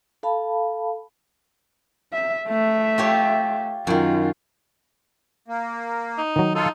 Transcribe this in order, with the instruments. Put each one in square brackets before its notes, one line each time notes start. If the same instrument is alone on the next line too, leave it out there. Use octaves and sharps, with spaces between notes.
[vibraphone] A4 F5 A5 B5
[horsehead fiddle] E5
A3 E5
[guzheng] F4 G4 C#5
[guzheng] F#2 D#3 [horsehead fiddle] F4
[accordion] A#3
[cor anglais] D#4
[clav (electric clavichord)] D#3 F#3
[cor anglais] D#4 [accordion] F4 A4